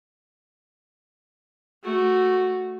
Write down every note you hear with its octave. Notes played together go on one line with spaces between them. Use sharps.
A3 F#4